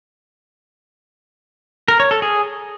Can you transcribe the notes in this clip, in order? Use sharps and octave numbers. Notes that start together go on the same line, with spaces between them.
A#4
C#5
A4
G#4